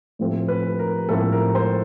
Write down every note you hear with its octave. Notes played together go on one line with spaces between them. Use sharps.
A2 F3 A3 C4
B4
A#4
A2 F3 A3 C4 A4
A#4
C5